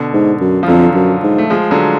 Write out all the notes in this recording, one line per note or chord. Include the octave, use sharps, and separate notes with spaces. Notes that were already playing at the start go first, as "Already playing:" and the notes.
Already playing: B2 D3
G#2
F#2
F3
F2 D3 F#3
F#2
G#2
A3
F3 G#3
D3 F#3